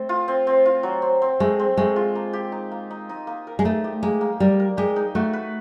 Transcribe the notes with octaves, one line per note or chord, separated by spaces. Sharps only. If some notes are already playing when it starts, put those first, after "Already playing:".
Already playing: A3 C4
F4
C4
C4
F4
F#3
C4
C4
G#3 A3
C4
G#3 A3
F4
A#3
G4
D#4
A#3
D#4
D#4
A#3
A#4
G#3
A3 D#4
G4
G#3 A#3
A#3
G3 A#4
A#4
G#3 G4
D#4
A3 F#4
B4